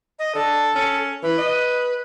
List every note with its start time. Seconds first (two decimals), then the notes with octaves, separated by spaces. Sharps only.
0.19 D#5
0.35 D3 A4
0.76 C#4
1.23 E3 B4
1.38 D#5